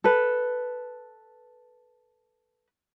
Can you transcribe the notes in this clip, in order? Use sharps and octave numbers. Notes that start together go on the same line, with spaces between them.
A4 B4